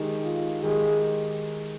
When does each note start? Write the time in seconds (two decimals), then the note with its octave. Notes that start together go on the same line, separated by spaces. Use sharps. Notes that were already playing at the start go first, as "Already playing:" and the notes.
Already playing: D#3 G#3 D#4 G4
0.24 F4
0.63 D#3 G#3 D#4 G4 G#4